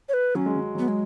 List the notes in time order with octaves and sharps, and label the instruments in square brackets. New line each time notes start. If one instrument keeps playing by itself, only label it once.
[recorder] C#5
B4
[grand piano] F#3 [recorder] C#4
[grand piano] G#3
F#3
[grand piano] F#3 [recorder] B3
[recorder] G#3